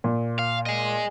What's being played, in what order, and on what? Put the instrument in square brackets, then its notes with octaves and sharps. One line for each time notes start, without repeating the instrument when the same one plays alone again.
[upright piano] A#2
[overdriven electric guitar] F5
G#4 D#5